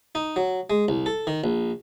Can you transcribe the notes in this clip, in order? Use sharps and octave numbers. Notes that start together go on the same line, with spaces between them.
D#4
F#3
G#3
C2
A4
D#3
A#1